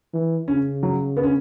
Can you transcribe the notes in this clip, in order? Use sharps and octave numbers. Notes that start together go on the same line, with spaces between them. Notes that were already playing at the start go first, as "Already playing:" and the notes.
E3
C#3 C#4
F#3
B3
C#4